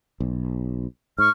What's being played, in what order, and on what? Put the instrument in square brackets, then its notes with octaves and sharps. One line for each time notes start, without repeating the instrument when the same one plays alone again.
[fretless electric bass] B1
[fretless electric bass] G#2 [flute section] C#6 F6